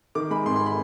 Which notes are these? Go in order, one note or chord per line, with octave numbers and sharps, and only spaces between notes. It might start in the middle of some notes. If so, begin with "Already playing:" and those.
D#3 D6
G#3 B5
G#1 C6
C6
B5